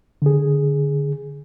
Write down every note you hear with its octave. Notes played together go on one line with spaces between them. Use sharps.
D3 G#4